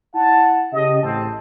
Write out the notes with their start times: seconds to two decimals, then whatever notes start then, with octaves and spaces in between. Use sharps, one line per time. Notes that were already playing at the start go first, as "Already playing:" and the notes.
0.15 E4 F#5 A5
0.73 C#3 G4 D#5
1.03 A1 C4 A5